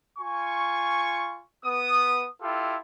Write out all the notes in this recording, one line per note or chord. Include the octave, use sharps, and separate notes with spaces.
F4 G#5 C#6
B3 D#6
E4 F4 G4 A4